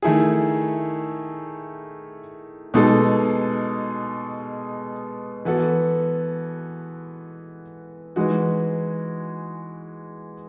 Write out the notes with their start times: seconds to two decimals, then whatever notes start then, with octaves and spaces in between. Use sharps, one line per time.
0.02 D#3 A3 E4 G#4
2.74 B2 G#3 D#4 A4
5.45 E3 B3 F#4 A4
8.16 E3 G#3 D#4 F#4